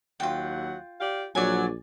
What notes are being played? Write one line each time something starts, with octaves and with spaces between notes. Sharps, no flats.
D#2 F#3 F4 F#5 G5
G4 D5 F5
A#1 F#3 D5 G#5